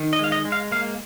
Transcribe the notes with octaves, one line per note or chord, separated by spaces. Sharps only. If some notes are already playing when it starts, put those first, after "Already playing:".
Already playing: D#3
D#5
G#3 F5
D#5
G#3
F5
A#3 F5